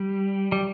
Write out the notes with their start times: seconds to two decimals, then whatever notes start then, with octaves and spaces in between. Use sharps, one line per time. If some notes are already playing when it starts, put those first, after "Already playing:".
Already playing: G3
0.52 G3